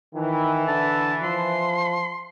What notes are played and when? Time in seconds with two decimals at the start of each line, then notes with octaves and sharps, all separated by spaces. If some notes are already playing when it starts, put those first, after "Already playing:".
0.15 D#3 E3
0.67 D3 A5
1.23 F3 C6